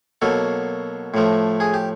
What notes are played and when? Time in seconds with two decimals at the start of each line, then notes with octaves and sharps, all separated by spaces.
0.22 B2 F#3 A#3 A4
1.14 A2 F3 A3
1.60 G#4
1.74 G4